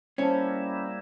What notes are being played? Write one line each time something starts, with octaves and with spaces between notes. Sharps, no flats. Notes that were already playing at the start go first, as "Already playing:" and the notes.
G3 A#3 C#4 E4 C5 A5